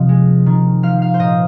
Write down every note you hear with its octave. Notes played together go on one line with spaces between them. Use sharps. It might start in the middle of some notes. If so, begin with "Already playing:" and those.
Already playing: C3 F3 C4 D#5
G#3
D#3
F3 F5
F5
C5
A#2 D#5